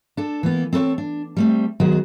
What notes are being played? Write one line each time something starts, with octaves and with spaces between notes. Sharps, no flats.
D4 A4
E3 A#3 B3
C4 A4 A#4 C#5
D4
G3 A3 C4
D#3 F#3 G#3 B3 F#4